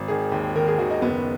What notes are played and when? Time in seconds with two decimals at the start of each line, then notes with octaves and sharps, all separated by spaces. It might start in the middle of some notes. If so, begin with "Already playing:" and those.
Already playing: G#1
0.08 D#3 G#4
0.32 D#2
0.55 D#3 A#4
0.67 G#4
0.78 D#3 F#4
0.90 D#4
1.02 F#1 B3